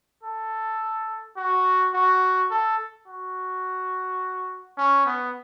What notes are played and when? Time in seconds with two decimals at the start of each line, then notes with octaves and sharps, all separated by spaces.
0.23 A4
1.37 F#4
1.94 F#4
2.51 A4
3.08 F#4
4.78 C#4
5.06 B3